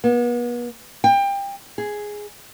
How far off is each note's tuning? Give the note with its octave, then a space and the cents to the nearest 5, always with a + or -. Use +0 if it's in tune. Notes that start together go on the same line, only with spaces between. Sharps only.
B3 -40
G5 +25
G#4 +0